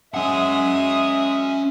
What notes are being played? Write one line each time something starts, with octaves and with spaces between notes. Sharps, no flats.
G#3 C#4 E5 F#5 D#6